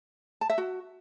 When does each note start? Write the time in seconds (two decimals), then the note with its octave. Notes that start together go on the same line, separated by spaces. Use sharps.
0.41 A5
0.50 E5
0.58 F#4